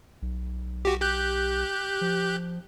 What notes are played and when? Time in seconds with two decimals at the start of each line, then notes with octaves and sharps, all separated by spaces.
0.22 B1
0.85 F#4 G4
1.02 G4 F#6 G6
2.01 F3